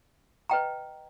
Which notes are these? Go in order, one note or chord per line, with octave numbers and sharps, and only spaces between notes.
B4 D#5 G5 A#5